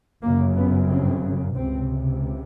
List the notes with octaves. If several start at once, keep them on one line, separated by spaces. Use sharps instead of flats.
G1 F#2 C#3 A#3
B3
C4
C#2 C3 C4